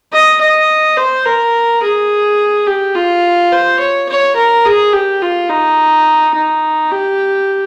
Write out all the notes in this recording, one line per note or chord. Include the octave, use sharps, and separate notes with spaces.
D#5
D#5
C5
A#4
G#4
G4
F4
C5
C#5
C#5
A#4
G#4
G4
F4
D#4
D#4
G4